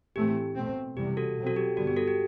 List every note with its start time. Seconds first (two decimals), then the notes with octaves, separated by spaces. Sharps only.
0.16 A2 E3 A3 C4 G4
0.56 B2 A3 C4
0.97 E2 C3 G3 G4
1.17 F#4 A4
1.36 B2 F#3 C4
1.47 F#4 A4
1.56 G4
1.76 G2 D3 G3 B3 F#4
1.87 G4
1.97 F#4 A4
2.08 G4